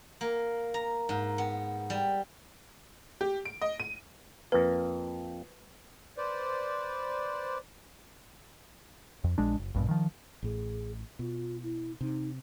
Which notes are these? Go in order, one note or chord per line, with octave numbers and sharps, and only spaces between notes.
A#3
A#5
G#2
B3
G3
G4
D7
D#5
D#7
F2 A#3 B4
B4 C5 D5
F2
A#1 G#3 D4
F#1
A#1 G2 B2
D#3 F3
A1 A2 G#4
B2 F4
E4
C3 D#4